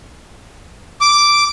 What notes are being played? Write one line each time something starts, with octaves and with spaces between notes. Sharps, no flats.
D6